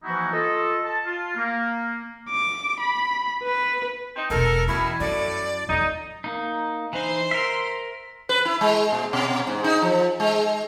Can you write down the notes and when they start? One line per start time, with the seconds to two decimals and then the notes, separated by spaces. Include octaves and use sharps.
0.03 E3 F3 A#3 D#4 E4 F#4
0.33 F4 A4 D#5
0.86 A5
1.06 F4
1.37 A#3
2.30 D6
2.80 B5
3.44 B4
4.16 C4 D#4
4.30 E1 F2 A4 A#4
4.68 B2 D#3 E3 C#4 E4
5.00 F#2 A2 D5
5.69 F2 F3 D#4
6.24 A#3 D#4
6.93 E3 D#4 C5 C6
7.31 A#4 E5
8.29 B4
8.45 E4
8.61 G#3
8.92 A#2
9.13 B2
9.47 G#2
9.64 D#4
9.82 F3
10.20 G#3